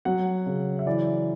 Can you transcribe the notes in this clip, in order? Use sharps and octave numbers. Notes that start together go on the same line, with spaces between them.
F#3 F#5
C#3
E5
E3 D5